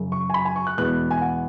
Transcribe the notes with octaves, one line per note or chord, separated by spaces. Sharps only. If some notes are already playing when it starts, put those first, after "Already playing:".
Already playing: F#2 C#3 F#3
C#6
G#5
B5
G#5
C#6
F#6
E2 B2 G#3 B3 F#6
G#5
F#5